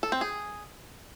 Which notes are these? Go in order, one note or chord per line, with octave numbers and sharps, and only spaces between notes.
A4
C4
G#4